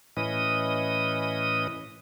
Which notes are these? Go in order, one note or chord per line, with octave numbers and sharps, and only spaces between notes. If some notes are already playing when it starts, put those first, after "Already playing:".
A2 E3 C#4 B4 D#5 D#6